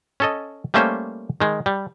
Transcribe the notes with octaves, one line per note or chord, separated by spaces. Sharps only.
C#4 A4 D#5
G3 A3 A#3 C#4 C5
D#3 G#3
G3